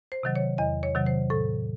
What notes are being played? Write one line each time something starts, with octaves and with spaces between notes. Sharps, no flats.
C5
C3 D#3 F#3
C#5
E2 D#5
C#5
C3 D#3 F#3
C5
A2 A4